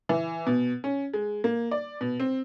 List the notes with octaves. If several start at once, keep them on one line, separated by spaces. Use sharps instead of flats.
E3
B2
C#4
G#3
A#3
D5
B2
C4